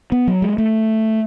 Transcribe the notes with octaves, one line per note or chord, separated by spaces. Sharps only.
B3
F#3
G#3
A3